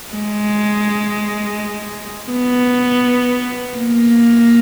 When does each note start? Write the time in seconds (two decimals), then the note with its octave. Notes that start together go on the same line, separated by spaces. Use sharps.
0.13 G#3
2.31 B3
3.77 A#3